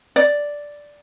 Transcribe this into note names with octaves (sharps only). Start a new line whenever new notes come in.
D5